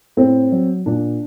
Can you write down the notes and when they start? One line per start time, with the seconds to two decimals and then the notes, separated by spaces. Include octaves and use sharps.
0.17 A2 C4
0.52 F#3
0.86 A#2 D4